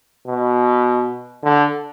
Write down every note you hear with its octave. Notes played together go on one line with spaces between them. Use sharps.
B2
D3